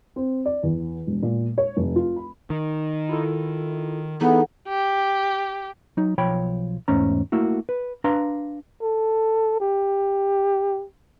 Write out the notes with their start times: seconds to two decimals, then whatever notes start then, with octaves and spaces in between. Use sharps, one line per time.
0.16 C4
0.45 D5
0.63 E2
1.07 E1
1.23 A#2
1.58 C#5
1.77 F1
1.96 F4
2.16 B5
2.50 D#3
3.09 E4 F4 A4
4.21 E3 B3 D#4 E4 G#4 A4 F#5
4.68 G4
5.97 F#3 D#4
6.18 B1 F3 C#5 G5 B5
6.88 E2 G#2 A3 C#4 C5 A#5
7.32 A3 A#3 E4 F#4
7.69 B4
8.04 D4 B4 F5 A#5 C6
8.82 A4
9.60 G4